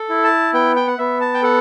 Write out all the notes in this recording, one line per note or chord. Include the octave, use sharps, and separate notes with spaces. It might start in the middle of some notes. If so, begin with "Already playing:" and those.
Already playing: A4
E4
A5
B3 G5
G5
F#5
B3 E5
A5
G5
A4 F#5